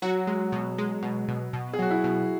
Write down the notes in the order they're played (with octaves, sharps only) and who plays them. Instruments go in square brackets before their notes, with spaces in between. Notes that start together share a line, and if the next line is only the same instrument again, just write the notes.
[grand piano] F#3 [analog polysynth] F#4
[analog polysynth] G#3
B2
G#3
B2
B2
B2
[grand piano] G#4
[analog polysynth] F#3 [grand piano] F#4
[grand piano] E4
[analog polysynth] B2